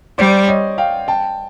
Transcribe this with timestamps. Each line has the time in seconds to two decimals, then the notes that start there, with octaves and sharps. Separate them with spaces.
0.18 G3 C5 D5
0.48 C#5 D#5
0.78 F5 G5
1.08 G5 A5